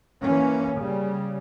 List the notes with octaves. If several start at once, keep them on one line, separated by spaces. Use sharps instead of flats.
E3 A#3 C#4
C#3 G3